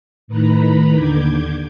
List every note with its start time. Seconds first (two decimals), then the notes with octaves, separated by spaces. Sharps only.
0.28 A2 D#3 B4 A#5 B5
0.94 D#2 D3 D6 G6 G#6